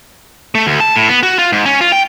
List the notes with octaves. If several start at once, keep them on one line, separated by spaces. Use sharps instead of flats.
A3
D2
A5
A2
B3
F#4
F4
G#2
C#4
F4
G5